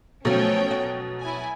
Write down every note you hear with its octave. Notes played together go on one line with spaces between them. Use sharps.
B2 F3 F#3 A3 C#4 C#5 G5
F#4
E4 G#5